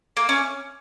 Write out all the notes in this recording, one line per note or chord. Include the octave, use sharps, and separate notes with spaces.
A#3
C#4